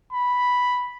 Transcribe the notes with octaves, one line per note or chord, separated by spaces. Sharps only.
B5